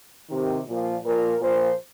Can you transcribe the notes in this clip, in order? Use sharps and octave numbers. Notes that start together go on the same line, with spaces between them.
C3 D#3
A#2 F3
A#2 F3 A#4
A#2 F3 C5